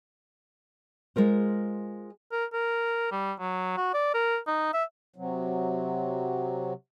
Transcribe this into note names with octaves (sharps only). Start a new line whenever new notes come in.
G#3 F4 A#4 C5
A#4
A#4
G3
F#3
F#4
D5
A#4
D#4
E5
C3 F#3